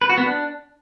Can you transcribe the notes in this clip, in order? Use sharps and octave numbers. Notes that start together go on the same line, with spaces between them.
B4
F#4
B3
D4